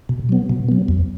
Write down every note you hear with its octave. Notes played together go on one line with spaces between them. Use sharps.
B2
F#3 B3
B2
F#3 B3
E2